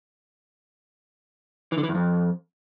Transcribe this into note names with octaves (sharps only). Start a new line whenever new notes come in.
E3
D3
E3
E2
F2